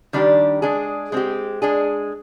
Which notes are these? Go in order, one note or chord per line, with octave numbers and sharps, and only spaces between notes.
D#3 G3 D4 G4
G#3 D4 G#4
G#3 C4 G4
G#3 D4 G#4